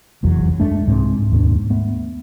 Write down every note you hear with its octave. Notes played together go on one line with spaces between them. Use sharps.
F1 B1 E2 F#3
F#2 G#3 A3 D4
C2 G#2 G#3 C4
D#2 G#2 B2 D4
A3 B3